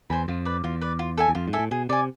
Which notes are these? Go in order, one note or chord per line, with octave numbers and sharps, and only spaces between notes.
E2 C5 G#5 B5
F2 F4
B4 D5
E2 F4
B4 D5
F4
A4 E5 G#5
E2
F2 F4
G#2
A4 E5 G#5
A2
B2 G#4
C3 D5 G#5